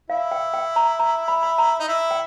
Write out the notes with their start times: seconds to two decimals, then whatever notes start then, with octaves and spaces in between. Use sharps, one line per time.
0.10 E4 F5
0.32 G5
0.54 G5
0.76 A#5
0.99 A#5
1.28 B5
1.43 B5
1.58 A#5
1.79 D#4
1.88 E4
2.11 G5